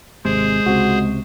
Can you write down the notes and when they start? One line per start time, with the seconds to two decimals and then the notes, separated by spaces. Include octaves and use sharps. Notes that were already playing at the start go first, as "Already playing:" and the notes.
0.25 G#1 C3 G#3 G#4 C5
0.66 C#2 C3 F#4